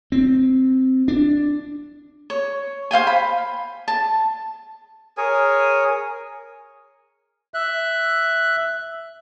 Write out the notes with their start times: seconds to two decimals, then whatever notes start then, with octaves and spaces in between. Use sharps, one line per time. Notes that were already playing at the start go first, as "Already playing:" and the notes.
0.12 C4
1.08 D4
2.30 C#5
2.91 C5 F5 G5 G#5
3.07 B5
3.88 A5
5.17 G#4 A#4 C#5 G#5
7.54 E5 F#6